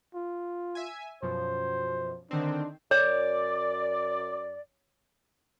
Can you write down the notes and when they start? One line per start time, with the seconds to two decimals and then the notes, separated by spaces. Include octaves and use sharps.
0.15 F4
0.75 E5 G#5
1.22 F#2 B2 F3 C5
2.31 D3 D#3 C4 D4
2.91 F#2 C#5 D5